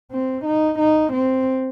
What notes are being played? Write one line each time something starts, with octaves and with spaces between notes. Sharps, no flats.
C4
D#4
D#4
C4